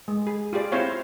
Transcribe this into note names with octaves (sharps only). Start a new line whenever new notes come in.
G#3
G#4
F4 G4 G#4 D5
C4 E4 F4 C5 C#5 F5